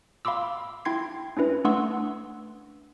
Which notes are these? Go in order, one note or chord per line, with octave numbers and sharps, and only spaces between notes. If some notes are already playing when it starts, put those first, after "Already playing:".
F5 B5 C6 D6 E6
E4 G5 C6 G#6 C7
C#4 D4 E4 B4
A3 D4 F#5 C6 C#6 E6